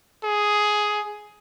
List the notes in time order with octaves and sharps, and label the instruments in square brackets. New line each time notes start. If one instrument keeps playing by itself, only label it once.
[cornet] G#4